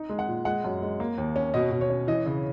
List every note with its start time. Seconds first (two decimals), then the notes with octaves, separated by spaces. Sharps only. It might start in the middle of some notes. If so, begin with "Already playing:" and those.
Already playing: D#4
0.09 G#3
0.19 F#5
0.28 A#2
0.45 G#3 F#5
0.64 F#2
0.82 G#3
1.00 A#3
1.18 D#2
1.36 C#4
1.54 B2 D#5
1.71 B2
1.81 C#5
1.90 C#4
2.08 E3 D#5
2.26 C#3